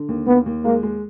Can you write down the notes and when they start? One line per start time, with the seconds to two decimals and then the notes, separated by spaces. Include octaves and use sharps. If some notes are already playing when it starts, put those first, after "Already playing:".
Already playing: D3
0.08 D#2
0.27 D#2 B3
0.46 D#2
0.64 G#3 A#3
0.83 G#3